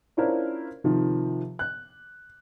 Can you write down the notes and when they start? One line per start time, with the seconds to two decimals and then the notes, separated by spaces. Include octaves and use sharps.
0.17 C#4 D4 E4 F4 A#4 C5
0.84 C3 D#3 F3
1.59 F#6